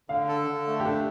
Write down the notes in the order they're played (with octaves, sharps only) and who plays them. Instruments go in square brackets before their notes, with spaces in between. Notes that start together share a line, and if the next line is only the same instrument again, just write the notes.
[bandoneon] D3 [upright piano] F5
[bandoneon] A4
D3
A3
[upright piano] G4
[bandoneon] D4 [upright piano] A4